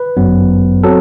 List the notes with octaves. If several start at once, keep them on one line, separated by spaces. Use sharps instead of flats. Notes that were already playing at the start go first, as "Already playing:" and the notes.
Already playing: B4
G1 F#2 F#3 B3
F#3 C4 A4